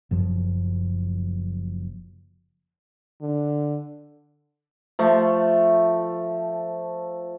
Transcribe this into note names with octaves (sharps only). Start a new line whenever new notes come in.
F#1 F#2 F3
D3
F3 A3